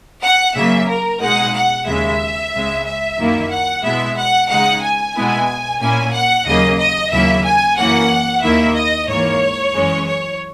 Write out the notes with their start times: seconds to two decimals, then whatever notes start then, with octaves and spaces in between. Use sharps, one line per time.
0.23 F#5
0.56 C#3 F#3 A#3 E5
0.89 A#4
1.22 B2 G#3 D#4 F#5
1.55 F#5
1.87 D#2 C#3 G#3 E5
2.53 C#2 C#3 G#3
2.86 E5
3.19 F#2 D#3 A#3 E4
3.51 F#5
3.84 B2 G#3 B3 E4 E5
4.17 F#5
4.49 C#3 G#3 D#4 F#5
4.83 G#5
5.15 B2 G#3 B3 E4
5.81 A#2 A#3 C#4 E4 G#5
6.13 F#5
6.47 D#2 C#3 F#3 A#3 D#5
6.79 D#5
7.11 D#2 C#3 F#3 A#3 E4 E5
7.44 G#5
7.77 F#2 E3 A#3 C#4 F#5
8.43 D#2 D#3 A#3 E4 E5
8.76 D#5
9.08 G#2 E3 A#3 C#5
9.75 F#2 E3 G#3 C#4
10.07 C#5